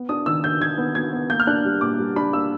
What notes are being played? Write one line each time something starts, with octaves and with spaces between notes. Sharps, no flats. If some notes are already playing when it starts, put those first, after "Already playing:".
Already playing: B3
D4 D#6
D#3 E6
D4 G6
D#3 G#6
B3
B3 G#6
B3
A#3 G6
F6
D4 F#6
G3
A#2 D6
G3
D4 B5
A#3 E6